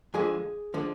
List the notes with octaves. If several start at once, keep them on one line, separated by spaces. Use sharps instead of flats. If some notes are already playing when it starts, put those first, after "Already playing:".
F2 D3 F3 G#3 G#4 G#5
D3 F3 G#3